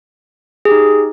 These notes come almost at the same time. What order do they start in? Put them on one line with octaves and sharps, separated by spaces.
G#4 G4 D#4